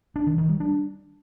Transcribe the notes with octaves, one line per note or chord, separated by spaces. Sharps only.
D4
D#3
D#3
G3
D4